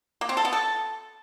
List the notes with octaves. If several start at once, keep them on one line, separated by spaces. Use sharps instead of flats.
A#3
C4
A4
B3
A4